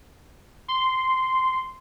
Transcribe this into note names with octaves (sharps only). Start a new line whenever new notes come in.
C6